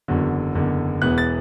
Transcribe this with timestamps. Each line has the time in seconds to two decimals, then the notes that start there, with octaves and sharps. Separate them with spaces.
0.08 F#1 E2 D3 F#3
0.55 F#1 E2 D3
1.02 E1 E2 E3 B3 F#6
1.18 A6